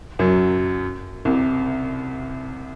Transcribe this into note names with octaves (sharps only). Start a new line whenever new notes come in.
F#2 F#3
C2 C3